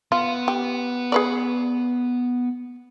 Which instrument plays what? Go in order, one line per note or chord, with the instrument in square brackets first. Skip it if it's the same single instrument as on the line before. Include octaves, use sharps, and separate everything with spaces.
[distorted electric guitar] B3 [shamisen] F4
[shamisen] G4
G#4 B4 D5